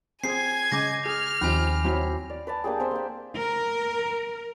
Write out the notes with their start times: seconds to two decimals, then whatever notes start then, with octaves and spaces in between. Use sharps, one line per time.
0.24 C4 G#4 G#5 G#6 C7
0.72 C#3 G#3 D6 G6 A#6
1.06 G#4 F6
1.41 D#2 D#3 F3 C4 G4 G#5 B5
1.84 F#3 C4 E4
2.30 D5
2.47 B4 D5 A5
2.64 A#3 D4 G4 G#4
2.80 C4 C5 E5 C6
2.91 A#3 G5
3.36 A#4